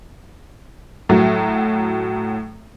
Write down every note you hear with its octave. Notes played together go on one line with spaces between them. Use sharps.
A2 F#3